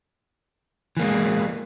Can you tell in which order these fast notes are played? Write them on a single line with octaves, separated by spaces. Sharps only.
E3 A#3 G#3